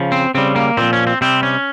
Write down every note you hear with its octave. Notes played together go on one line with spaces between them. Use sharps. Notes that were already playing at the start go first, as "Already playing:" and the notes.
Already playing: C#3 F3
C4
C#3 G3 C4
A#3
A#2 F3 C4
C#4
C4
C3 G3 C4
C#4